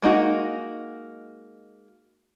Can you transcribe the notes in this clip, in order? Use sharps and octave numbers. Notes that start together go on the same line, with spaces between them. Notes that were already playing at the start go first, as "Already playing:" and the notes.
G#3 A#3 D#4 F#4